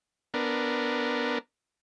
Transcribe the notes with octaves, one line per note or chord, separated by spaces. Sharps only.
B3 D4 A#4